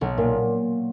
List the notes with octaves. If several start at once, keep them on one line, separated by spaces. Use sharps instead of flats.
B1
A#2